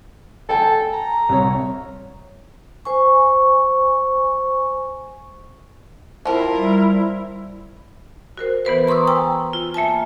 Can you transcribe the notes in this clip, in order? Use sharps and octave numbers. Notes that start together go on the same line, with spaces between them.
A4 G5 G#5
A#5
C2 C#5
C5 G#5 C#6
F3 C4 E4 F4 A#4
G3
F#4 A#4 C5
E3 B3 B4 C5
A#5 C6 C#6 D#6 E6
G5 G#5 A#5 E6
F4
A#3 E5 G#5 A5